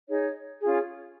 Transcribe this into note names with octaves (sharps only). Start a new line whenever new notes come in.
D#4 G#4 C#5
C#4 F4 G#4